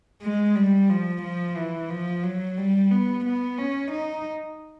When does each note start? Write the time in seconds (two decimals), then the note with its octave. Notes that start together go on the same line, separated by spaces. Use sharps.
0.22 G#3
0.56 G3
0.90 F3
1.22 F3
1.57 E3
1.91 F3
2.23 F#3
2.57 G3
2.91 B3
3.25 B3
3.58 C#4
3.91 D#4